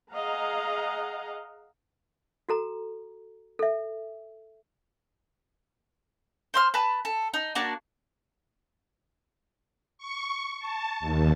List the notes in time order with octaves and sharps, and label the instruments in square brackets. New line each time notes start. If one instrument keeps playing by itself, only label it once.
[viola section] G#4 D#5 F5 F#5 A#5
[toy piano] F#4 A4 A#5
A4 E5
[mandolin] C5 C6 F6
B4 A5
A4
D#4
A#3 D4 F#4 A5
[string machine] C#6
A5
D#2